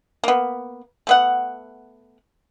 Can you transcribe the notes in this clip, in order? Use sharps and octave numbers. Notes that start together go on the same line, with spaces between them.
A#3 B3
A3 B3 F#5